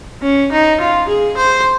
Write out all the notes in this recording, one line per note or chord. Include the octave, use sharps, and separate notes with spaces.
C#4
D#4
F4
G#4
C5